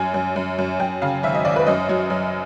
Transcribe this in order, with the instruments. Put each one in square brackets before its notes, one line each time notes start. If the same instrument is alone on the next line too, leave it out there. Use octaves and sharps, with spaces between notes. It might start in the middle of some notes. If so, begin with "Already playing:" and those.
Already playing: [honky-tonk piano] F#2 G#5
F#2
F#2
F#2
F#2 G5
C#3 F5
G#1 E5
D#5
G#1 D5
B4
F#2 D#5
F#3
F#2